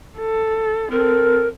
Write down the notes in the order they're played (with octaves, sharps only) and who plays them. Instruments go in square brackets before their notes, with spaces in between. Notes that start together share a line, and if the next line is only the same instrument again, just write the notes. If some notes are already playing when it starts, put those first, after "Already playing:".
[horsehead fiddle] A4
[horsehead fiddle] C4 A4 [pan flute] A#4